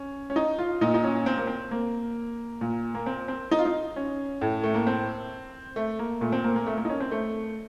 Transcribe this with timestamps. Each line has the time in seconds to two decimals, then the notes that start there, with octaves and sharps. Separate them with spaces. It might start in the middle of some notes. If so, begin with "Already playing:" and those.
Already playing: C#4
0.30 C#4
0.36 D#4
0.59 F4
0.81 A#2 D#4
0.94 D#4
1.04 C#4
1.26 C4
1.37 A#3
1.47 C4
1.71 A#3
2.61 A#2
2.95 A#3
3.06 C4
3.28 C4
3.51 D#4
3.59 F4
3.65 D#4
3.96 C#4
4.41 A2
4.63 A3
4.74 A#3
4.87 C4
5.76 A3
5.99 A#3
6.21 A#2 A3
6.32 C4
6.44 A#3
6.56 A#3
6.66 A3
6.77 A#3
6.85 D#4
6.89 C#4
7.00 C4
7.11 A3